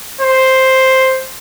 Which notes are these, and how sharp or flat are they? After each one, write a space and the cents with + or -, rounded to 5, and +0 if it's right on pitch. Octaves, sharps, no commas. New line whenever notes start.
C5 +5